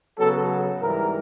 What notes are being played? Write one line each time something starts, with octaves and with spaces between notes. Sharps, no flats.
C#3 F#3 B3 A4
G#2 E3 G3 A#4